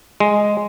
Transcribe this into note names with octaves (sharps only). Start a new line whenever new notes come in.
G#3